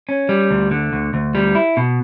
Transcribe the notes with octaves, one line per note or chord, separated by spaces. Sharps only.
C#4
G3
D2
D3
D2
D2
G3
E4
B2